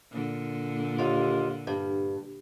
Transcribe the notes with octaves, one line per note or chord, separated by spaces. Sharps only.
A#2 D3
D#2 F4
G2